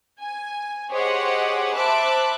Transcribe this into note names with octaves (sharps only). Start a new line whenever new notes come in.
G#5
G4 G#4 C5 C#5 D#5 F#5
C5 E5 A5 B5 D6 F#6